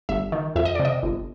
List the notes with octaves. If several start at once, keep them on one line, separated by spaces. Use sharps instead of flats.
G1 E5
D#3
F2 E5
D#5
C3 D5
D#5
G1